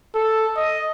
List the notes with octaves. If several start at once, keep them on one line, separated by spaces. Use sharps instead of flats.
A4
D#5